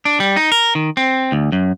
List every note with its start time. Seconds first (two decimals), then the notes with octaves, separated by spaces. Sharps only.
0.05 D4
0.20 G3
0.36 D#4
0.52 A#4
0.75 D#3
0.97 C4
1.32 D2
1.52 F#2